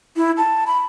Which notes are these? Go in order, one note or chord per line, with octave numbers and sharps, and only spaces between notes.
E4
A5
B5